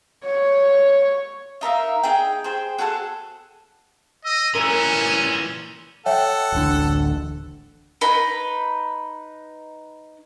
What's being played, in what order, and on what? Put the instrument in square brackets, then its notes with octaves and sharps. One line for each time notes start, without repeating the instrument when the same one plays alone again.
[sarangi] C#5
[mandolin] D#4 A#4 E5 F5
D#4 G#4 G5
G#4 C5 G5
F#4 G#4 A4 F#5
[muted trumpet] D#5 [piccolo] E6
[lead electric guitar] A#2 E3 [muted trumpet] C#4 [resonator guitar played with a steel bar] A#4 [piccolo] D#7
[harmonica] A4 F#5 [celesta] C#5 E5 G5
[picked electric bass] D1 A1 D3
[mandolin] D#4 B4 B5